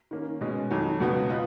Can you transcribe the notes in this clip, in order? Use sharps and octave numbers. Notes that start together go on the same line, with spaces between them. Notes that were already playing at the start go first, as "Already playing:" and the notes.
D#3 A#3 C#4
B2 G#3 C#4
F2 D#3 F#3
C#2 B2 F#3 B3
F4 B4 D#5